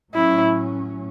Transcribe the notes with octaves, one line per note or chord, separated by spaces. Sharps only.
A2 F#3 C#4 E4